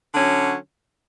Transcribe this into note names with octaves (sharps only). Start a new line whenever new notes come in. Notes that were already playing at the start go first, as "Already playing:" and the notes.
D3 F#3 C#4